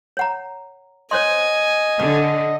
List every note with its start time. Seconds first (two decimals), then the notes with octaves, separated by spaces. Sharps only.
0.17 C#5 F#5 A#5
1.11 C5 C#5 D#5 G#5 C6
2.00 D3 D5